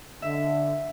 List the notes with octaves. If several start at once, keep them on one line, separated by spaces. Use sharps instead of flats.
D3 E5